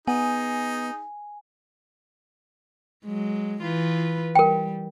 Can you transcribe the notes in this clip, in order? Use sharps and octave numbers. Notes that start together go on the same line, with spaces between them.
B3 D#4 G#4 G#5
F#3 G#3
E3 F4 B4
G3 A#4 G5